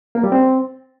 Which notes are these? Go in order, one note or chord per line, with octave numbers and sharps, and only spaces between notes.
A#3
G3
C4